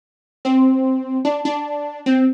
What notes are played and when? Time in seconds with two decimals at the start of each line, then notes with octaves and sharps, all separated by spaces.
0.45 C4
1.25 D4
1.45 D4
2.06 C4